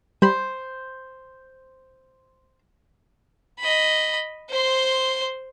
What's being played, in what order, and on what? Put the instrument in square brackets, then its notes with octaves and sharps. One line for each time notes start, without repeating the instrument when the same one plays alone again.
[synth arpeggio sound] G3 B5 [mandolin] C5
[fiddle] D#5 B5
C5 C6